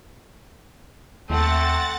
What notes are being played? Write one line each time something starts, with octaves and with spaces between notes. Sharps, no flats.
D#2 A3 C4 F#5 A6